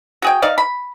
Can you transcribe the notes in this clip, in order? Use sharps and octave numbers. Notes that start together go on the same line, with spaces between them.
F#4 G#4 G5
D#4 D5 F5
B5